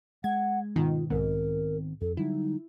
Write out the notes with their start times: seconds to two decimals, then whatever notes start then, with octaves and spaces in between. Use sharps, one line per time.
0.24 G#3 F#5 G#6
0.76 G#2 B2 D#3 F4
1.10 B1 G#2 D#3 B3 C4 A#4
2.01 F2 A4
2.17 D3 F#3 G3 D#4 E4